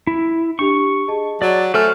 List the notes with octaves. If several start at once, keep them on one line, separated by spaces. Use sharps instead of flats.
E4
D4 G4 C#6 F7
G#4 D#5 A5
F#3 D5
A3 F#4 C5 G#5 F6